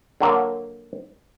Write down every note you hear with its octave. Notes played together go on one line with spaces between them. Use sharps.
D3 F#3 A#3